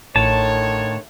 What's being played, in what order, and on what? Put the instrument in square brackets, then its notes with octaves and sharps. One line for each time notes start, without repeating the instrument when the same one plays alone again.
[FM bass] A1 [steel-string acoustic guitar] A2 [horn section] D3 D#3 C#5 [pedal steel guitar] A5